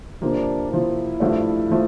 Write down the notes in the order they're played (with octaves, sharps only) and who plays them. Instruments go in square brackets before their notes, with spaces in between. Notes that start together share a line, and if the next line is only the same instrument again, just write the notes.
[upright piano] C3 F3 A#3 [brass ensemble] D4
[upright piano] C3 F3 A#3 [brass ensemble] E4
[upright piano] G2 F3 A3 D4
F3 A3